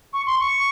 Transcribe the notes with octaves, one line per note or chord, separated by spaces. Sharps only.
C#6
C6
C#6